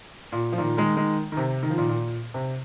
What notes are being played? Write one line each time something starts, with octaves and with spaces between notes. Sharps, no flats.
A#2
F3
A#2 D#3
D#3 G#3
D#3 G#3
D#3
C3
D#3
F3
A#2 D#3
A#2
C3